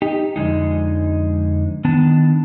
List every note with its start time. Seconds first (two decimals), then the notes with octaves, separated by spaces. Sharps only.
0.02 D#4 G4
0.36 F2 D3 G#3 D#4
1.85 D#3 B3 D4 A5